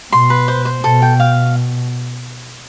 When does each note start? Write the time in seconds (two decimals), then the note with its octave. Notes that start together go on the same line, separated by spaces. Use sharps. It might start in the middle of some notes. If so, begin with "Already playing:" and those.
0.12 B2 C6
0.30 B4
0.48 C5
0.65 C5
0.84 B2 A4
1.02 G5
1.20 F5